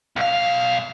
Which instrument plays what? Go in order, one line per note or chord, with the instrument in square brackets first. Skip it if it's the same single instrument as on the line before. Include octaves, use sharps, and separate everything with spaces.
[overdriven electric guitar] B1 F5